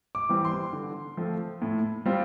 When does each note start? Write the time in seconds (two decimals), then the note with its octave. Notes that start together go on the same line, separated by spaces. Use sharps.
0.15 D6
0.29 E3 G3 C4
0.45 C6
0.73 D3
1.17 F3 A3 C4
1.62 A2
2.06 G3 C4 F4